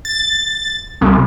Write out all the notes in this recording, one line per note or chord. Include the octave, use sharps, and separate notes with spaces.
A6
C2